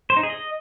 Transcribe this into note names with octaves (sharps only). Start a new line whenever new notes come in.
C5
D#4
G#4
D#5